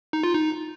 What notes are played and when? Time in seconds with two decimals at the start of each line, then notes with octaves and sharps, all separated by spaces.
0.13 D#4
0.23 F4
0.34 D#4